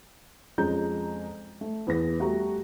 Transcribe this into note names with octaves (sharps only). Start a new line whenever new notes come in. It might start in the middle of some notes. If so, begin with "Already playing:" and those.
F2 G#3 C#4 A#5 G6
A3
E2 B3 G#4 A#6
G3 A3 F#4 G4 A4 A#5